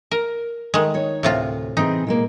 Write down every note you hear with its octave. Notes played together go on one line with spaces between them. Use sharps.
A#4
D#3 G#3 A3
D#4 C#5
D2 A2 C3 F4
E3 C4 D#4 G#4
A#2 G#3 A#3